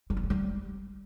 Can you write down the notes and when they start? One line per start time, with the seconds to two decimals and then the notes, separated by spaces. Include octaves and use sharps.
0.10 G3
0.17 B3
0.23 A#3
0.30 G3